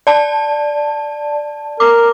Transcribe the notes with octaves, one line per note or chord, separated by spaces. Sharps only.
D5 A5
A#4 D6